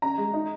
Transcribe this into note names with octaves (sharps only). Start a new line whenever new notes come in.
C#4 A#5
G#3
D#4